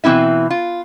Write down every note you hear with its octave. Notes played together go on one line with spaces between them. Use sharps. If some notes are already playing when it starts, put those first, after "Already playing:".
B2 E3 C4 E4 E5
F4